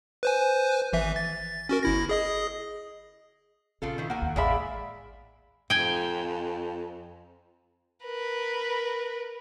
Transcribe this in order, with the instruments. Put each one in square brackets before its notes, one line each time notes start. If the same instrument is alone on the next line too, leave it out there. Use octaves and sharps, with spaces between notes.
[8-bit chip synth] B4 C5 G#5
G#1 E3 E5
A6
C#4 F#4 A#4
G1 E4 A#6
G#4 D#5 D#6
[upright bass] A#1 [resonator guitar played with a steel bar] C#3 F4 A4
[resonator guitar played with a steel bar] D#3 E3
[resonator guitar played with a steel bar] A#3 G#5 [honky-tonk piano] F#5
[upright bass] A1 D#2
[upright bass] A1 [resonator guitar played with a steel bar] G#3 D5 E5 [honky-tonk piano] G#4 F5 B5
[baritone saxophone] F2 [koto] G5 G#5
[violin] A#4 B4